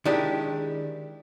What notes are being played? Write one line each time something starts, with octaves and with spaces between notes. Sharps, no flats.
D#3 G#3 D4 E4 G4